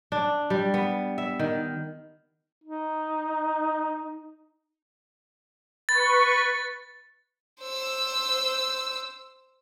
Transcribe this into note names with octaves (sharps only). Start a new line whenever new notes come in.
D4
G3
B3
E5
D#3
D#4
B4 C#6 A6
C5 E6